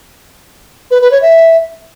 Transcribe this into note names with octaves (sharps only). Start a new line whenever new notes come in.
B4
B4
C#5
E5